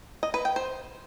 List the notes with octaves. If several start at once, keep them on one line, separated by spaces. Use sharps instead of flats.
D#5
B4
G5
C5